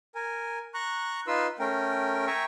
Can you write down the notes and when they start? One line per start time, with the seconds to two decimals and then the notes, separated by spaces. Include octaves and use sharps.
0.15 A#4 G#5
0.74 A#5 C#6 F#6
1.27 D#4 F4 B4 C6 E6
1.59 A3 C#4 A#4 G5
2.27 E5 G5 G#5 A#5 C#6